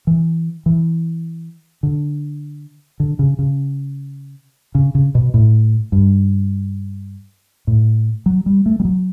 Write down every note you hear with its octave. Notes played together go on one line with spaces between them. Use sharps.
E3
E3
D3
D3
C#3
C#3
C#3
C#3
B2
A2
G2
A2
F#3
G3
A3
G3
F#3